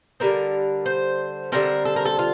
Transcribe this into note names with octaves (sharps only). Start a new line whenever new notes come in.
D3 G3 C4 A#4
C5
D3 G3 C4 A#4
A4
A#4
A4
F4